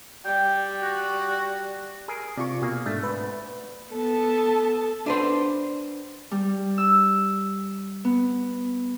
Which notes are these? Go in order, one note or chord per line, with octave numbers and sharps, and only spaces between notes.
G3 G5
F#4
G#4 A#4 G#5
C3 F4 D5 C#6
B2 A#3 G#4
G#2 A3 D4
D2 B4
B3 A4 A5
D4 B4 C5
G3
E6
B3